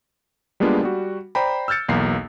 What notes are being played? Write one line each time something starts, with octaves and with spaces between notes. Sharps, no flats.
G3 G#3 A#3 B3 D4 F4
G3 F#4
C5 D5 G5 A#5 B5
E6 F6 G6 A6 C#7
B1 E2 A#3 C7